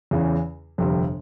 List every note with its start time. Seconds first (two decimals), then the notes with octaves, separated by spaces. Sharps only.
0.11 E2 C#3 E3
0.78 G1 F2 C3